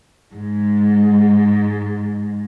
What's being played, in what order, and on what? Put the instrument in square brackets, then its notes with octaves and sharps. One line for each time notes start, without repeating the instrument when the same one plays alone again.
[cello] G#2 G#3